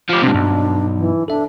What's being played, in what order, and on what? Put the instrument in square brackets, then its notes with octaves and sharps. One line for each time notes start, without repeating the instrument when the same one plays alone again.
[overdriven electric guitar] F3 G4
[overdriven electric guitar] G#2 C3 [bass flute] D4
[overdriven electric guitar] B1 [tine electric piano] G2
[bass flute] E3
[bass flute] D4 [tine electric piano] A4 E5